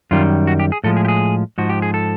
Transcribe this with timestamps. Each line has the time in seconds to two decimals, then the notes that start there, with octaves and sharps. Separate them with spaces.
0.11 F#2 D#3 G3 F4
0.47 F#4
0.60 G4
0.72 G#4
0.84 A2 F3 G#3 A4
0.97 G#4
1.05 G4
1.08 G#4
1.58 G#2 F3 F#4
1.69 G4
1.82 G#4
1.94 A4